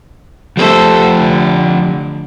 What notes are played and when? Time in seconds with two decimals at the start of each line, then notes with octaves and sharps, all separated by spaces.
0.57 F3 A3 G4 A4 C5
1.17 D3